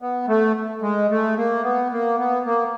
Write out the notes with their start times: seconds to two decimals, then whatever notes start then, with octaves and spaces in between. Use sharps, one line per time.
0.02 B3
0.28 A3
0.82 G#3
1.10 A3
1.38 A#3
1.64 B3
1.92 A#3
2.18 B3
2.46 A#3